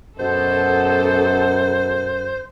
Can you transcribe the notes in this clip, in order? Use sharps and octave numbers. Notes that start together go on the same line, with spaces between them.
F#2 B2 A4 C5